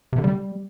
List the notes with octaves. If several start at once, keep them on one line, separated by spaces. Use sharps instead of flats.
C3
D3
G3